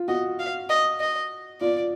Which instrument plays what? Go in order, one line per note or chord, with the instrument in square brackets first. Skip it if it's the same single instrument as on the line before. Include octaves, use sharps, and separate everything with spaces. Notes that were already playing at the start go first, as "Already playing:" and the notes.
Already playing: [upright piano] F4
[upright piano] F#4 [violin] D#5
[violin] F5
D#5
D#5
[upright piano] F4 [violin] D5